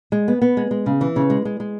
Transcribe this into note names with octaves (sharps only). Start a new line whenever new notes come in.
G#3
B3
B3
G#3
G#3
C#3
E3
C#3
G#3
G#3
G#3